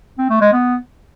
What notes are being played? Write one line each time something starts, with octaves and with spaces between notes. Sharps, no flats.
C4
A3
G#3
B3